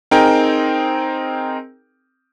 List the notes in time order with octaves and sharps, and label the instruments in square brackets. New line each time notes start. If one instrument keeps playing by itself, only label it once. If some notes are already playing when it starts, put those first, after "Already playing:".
[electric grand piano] C4 D#4 G#4 A#4 G5